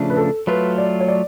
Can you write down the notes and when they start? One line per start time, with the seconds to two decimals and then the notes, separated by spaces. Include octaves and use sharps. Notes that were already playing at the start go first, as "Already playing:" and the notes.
Already playing: C#3 F3 A3 D4
0.10 B4
0.17 A4
0.47 F#3 A3 F4 B4
0.78 D5
1.00 C#5
1.08 D5